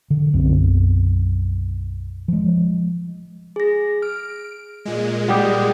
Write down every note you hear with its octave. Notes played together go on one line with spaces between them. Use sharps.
D3
B1 F#2 C4
F3 G#3
G#4 A#6
F6 D7
A#2 G#3
G3 G4 F#5 D#6